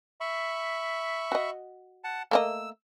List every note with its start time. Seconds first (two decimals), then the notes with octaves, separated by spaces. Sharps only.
0.21 E5 B5 C#6
1.32 F#4 D#5
2.04 F#5 A5
2.31 A3 A#3 D#5 E6